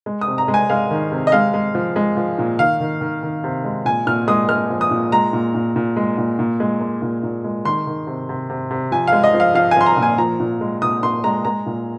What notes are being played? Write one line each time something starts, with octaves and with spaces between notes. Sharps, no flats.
G#3
D#6
C3
A#5
G#3
G#5
G#3 F5
D#3
C3
D#5
G#3 F5
G#3
F3
G#3
F3
A#2
D#3 F5
D#3
D#3
D#3
C3
G#3
A#2 G#5
A#2 F6
G#3 D#6
G#3 F6
F3
D#6
A#2
G#3 A#5
A#2
A#2
A#2
G#3
A#2
A#2
G#3
G#3
A#2
A#2
G#3
D#3 C6
D#3
C3
C3
C3
C3
F3 G#5
G#3 F5
D#5
F3
F5
F3 F5
G#5
F3 C6
A#5
A#2
G#5
F3 A#5
A#2
G#3
A#2 D#6
A#2 C6
G#3 A#5
G#3 A#5
A#2